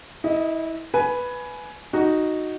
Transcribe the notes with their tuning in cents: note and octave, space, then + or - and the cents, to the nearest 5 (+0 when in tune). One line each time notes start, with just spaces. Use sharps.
E4 -25 D#5 +0
B4 +0 G#5 +15
D#4 +0 F#4 +0